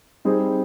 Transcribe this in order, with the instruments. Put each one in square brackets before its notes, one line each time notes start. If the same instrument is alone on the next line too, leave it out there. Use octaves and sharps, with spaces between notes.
[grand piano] G3 C4 D#4 G#4